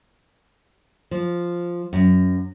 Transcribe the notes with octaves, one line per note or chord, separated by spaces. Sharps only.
F3
F#2